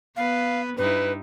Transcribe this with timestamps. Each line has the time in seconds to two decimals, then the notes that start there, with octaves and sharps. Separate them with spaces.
0.17 B3 B4 F5
0.78 G2 D#4 E4 B4